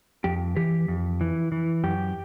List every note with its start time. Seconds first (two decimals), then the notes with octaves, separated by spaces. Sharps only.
0.24 F2 G4
0.56 E3 G4
0.88 F2
1.21 E3
1.52 E3
1.84 F#2 G4